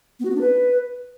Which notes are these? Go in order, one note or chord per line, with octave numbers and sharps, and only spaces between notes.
B3
F#4
B3
D4
B4